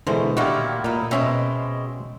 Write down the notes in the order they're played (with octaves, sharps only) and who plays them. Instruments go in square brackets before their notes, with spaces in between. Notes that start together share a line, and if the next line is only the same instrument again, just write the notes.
[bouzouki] B2 C5 [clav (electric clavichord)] D3 E3 G#3
[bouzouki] A#2 D#3 E4 [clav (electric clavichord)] F#4 G4
[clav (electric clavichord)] A#2 [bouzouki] D#4 E4
[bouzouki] B2 G#3 C4 [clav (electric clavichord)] C#4 E5 G5